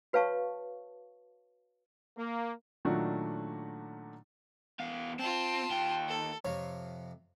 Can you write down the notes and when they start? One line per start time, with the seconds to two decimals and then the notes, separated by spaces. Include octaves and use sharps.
0.13 F#4 B4 C#5 F5 A5 C#6
2.17 A#3
2.85 A#2 D#3 F#3 A3 D4 F#4
4.79 E2 F5
5.19 C4 F4 A5
5.70 D#2 G5
6.08 A4
6.45 F2 C3 F3 C#5